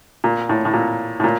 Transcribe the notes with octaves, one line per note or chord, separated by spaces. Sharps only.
A#2
A2
A2
A#2
A2
A#2